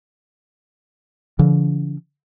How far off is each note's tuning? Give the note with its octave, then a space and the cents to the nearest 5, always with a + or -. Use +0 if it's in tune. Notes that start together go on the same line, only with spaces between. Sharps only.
D3 -45 F3 -45